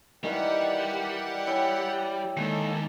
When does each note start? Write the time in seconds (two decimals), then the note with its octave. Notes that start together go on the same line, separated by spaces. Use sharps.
0.23 D#3 E3 G3 G4 D5 F#5
1.47 E4 C#5 G5 G#5
2.37 D#2 D#3 G#3 A4